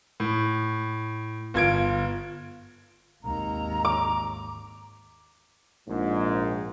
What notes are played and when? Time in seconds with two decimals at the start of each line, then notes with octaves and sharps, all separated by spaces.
0.20 A2
1.54 G1 F4 G#6 D7
3.24 G#1 D#2 A#5
3.85 D6
5.89 A#1 G#2